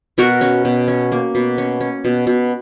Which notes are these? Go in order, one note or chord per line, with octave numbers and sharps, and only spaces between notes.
B2 F#4 A#4
C#4
B2
C#4
A#3
B2
C#4
C#4
B2
B2